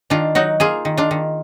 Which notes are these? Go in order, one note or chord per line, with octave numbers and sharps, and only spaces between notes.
D#3 D4 F4
F#3 D#4 F#4
A#3 F4 G#4
D#3
D4 F4
D#3